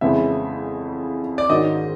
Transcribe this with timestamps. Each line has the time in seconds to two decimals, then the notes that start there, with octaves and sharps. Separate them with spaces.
0.01 F2 C#3 E3 G#3 B3 E5
1.38 D5
1.49 G#2 D#3 G#3 C#4 F#4 D#5